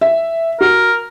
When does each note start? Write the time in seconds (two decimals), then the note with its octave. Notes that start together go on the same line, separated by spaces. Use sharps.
0.01 E5
0.61 F#4 A#4